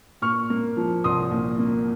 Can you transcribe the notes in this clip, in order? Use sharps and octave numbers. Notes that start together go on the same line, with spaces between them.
A#2 C#6 F6
A#3
F3
C2 C6 D#6
A#2
A#3